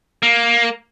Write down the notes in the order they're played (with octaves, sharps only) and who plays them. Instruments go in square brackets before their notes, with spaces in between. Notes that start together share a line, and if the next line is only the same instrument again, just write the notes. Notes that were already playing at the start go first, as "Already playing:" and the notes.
[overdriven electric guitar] A#3